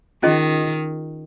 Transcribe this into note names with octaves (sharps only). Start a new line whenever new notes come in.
D#3 C#4 F4 G#4 D#5